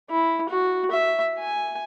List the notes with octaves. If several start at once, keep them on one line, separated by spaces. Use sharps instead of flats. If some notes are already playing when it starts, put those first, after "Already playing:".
E4
F#4
E5
G#5